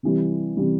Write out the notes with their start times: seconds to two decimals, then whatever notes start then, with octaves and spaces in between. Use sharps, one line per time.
0.03 C3 E3 G3
0.57 C3 E3 G3